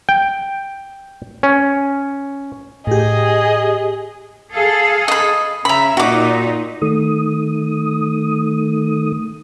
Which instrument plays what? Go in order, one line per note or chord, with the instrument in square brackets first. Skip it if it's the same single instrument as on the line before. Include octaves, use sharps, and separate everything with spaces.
[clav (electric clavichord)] G5
C#4
[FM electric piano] A2 G4 [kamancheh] G#4 D#5
[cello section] G#4 A4 F5
[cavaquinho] D#5 B5
[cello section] C#3 E5 [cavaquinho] A#5 B5
[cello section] A#2 D#4 [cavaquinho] F#4 D6
[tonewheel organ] D#3 A3 D#6